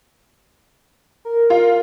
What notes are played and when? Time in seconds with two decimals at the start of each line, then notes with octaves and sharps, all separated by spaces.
1.25 A#4
1.50 F4